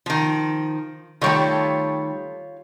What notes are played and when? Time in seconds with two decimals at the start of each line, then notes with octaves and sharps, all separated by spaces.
0.06 D#3 F3
1.21 D#3 G3 A3 F4 C#5 C#6